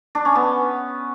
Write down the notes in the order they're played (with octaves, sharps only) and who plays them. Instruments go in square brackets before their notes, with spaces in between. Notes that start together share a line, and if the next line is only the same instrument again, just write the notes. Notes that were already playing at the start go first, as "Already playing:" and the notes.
[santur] D4
C#4
B3